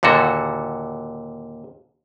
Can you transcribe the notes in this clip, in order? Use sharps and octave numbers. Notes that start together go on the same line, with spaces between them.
D#2 A#2 D3 F#4 A4